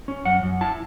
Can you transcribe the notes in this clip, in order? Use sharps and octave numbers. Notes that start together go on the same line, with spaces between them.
C#4
F#2 F#5
F#2
E4 A5